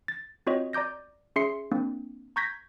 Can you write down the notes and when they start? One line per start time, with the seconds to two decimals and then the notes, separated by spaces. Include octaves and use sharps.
0.08 A6
0.47 C4 F4 F#4 C#5 D#5
0.73 D5 A#5 D6 G6 A#6
1.36 C#4 G#4 E5 C6 C7 C#7
1.72 A#3 C4 D4
2.36 A#5 C#6 G6 G#6 A#6 B6